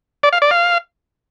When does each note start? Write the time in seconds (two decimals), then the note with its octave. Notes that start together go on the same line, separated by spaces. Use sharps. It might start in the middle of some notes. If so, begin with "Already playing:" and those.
0.23 D5
0.33 F5
0.42 D5
0.51 F5